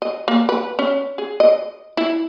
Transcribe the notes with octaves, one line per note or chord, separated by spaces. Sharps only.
D#5
A#3
B4
C#4
G#4
D#5
E4